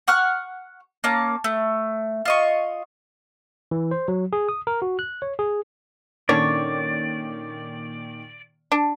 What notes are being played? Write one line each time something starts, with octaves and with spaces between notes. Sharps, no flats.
F#5 C#6 F6 F#6
A#3 C#4 A5
A3
F4 D#5 C#6
E3
C5
F#3
G#4
D#6
A#4
F#4
F#6
C#5
G#4
A#2 D3 D#3 C#4 C#5 D5
D4